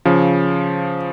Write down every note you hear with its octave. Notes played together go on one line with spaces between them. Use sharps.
C#3 F3